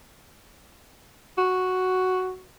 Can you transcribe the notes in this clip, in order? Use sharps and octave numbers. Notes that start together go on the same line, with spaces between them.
F#4